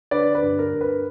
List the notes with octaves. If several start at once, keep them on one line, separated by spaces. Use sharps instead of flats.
D3 B4 D5
B4
G2
A#4
G2
B4